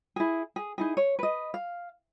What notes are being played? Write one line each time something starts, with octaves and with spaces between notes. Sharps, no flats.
E4 G#4
G#4
D#4 E4 G#4
C#5
B4 D#5
F5